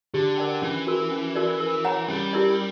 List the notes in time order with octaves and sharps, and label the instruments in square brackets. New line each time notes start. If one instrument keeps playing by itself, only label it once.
[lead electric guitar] D3 [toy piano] G4
[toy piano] A#4 D5 G5
[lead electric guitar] E3 [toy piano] C#4
[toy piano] F#4 A#4
C#4
F#4 A#4 D5
A#4
C#5 F#5 A#5
[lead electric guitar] G3 [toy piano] C#4
[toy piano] E4 G4 A#4 D5